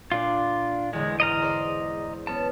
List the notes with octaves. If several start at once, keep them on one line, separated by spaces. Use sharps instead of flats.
A#2 D4 F4
E2 D3 G#3
G#2 D#5 A#5 F6
C5 D5
B3 C#4 A5